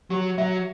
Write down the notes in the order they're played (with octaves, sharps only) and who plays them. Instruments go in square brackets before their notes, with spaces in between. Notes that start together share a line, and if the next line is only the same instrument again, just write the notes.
[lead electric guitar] F#3 [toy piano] G4
[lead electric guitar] F#3 [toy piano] E5